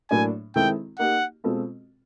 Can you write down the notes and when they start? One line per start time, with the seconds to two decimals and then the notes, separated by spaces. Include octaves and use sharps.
0.11 A2 F#3 A#3 D4 G#5
0.56 D#3 G#3 C4 E4 A4 G5
0.99 A#3 D#4 G4 F#5
1.44 B2 G#3 C4 F4 A4